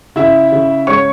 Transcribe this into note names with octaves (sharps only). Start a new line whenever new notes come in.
C#3 E4 E5
C#3
G#3 C#5 C#6